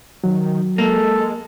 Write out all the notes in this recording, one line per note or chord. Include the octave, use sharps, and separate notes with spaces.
D#3 F#3
G#3 A#3 A4